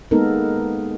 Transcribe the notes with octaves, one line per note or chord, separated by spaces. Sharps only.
G#3 A#3 B3 D#4 A4 A#4